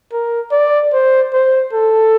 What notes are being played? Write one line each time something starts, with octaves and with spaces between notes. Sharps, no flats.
A#4
D5
C5
C5
A4